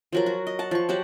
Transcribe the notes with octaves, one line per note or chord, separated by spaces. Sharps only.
F3 F#3 A#4
F#4
D#5
F#5 A5
F3 C#6
F#3 G4 F#5 A5